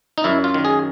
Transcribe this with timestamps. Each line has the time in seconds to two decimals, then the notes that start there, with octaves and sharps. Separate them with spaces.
0.18 D#4
0.24 F#2 E4
0.44 F4
0.54 D#3
0.65 G#4